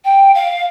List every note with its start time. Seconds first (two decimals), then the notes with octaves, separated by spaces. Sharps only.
0.05 G5
0.35 F5